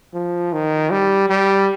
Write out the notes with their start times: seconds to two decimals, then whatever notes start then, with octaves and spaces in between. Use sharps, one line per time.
0.13 F3
0.53 D#3
0.91 G3
1.29 G3